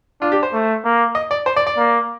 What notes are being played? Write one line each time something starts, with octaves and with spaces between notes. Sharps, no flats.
D4 F4
G4
C5
A3
A#3
D#5
D5
C5
D5
D5
A#3